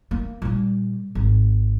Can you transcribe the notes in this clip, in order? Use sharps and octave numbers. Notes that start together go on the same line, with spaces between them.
A#3
A#2 G3
G#1